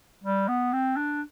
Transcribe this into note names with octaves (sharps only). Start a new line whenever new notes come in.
G3
B3
C4
D4